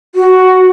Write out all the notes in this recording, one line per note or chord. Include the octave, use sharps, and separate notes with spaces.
F#4